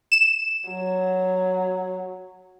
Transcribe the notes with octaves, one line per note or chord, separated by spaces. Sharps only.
E7
F#3